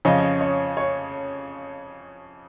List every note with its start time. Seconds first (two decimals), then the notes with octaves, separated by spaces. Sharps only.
0.05 F2 C#3 F3 C#4 D#5
0.41 C#5
0.77 C#5